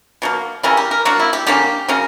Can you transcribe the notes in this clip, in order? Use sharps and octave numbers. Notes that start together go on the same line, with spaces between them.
B2 F#3 A#3
C#3 E3 G3 C#4 A#4
G4
A#4
F#3 A#3 D4 F#4
E4
G4
D3 A#3 C#4 G4
C#3 F#3 C#4 A#4